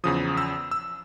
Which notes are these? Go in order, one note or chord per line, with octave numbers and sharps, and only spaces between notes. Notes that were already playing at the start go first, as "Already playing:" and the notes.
E2 C#3 F3 D#6
E6
E6